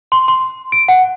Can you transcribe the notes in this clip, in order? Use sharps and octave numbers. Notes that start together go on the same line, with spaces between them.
C6
C6
D7
F#5